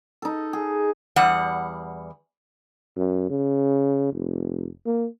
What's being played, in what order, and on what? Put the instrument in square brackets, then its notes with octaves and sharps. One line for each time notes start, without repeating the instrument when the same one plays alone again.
[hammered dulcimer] D#4 A4
G#4
[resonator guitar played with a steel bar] E2 G3 F#5
[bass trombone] F#2
C#3
F1
A#3